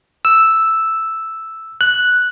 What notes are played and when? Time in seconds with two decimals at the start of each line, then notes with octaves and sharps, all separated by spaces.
0.25 E6
1.81 F#6